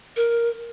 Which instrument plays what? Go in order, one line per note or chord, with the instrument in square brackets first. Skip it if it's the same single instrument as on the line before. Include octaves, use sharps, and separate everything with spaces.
[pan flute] A#4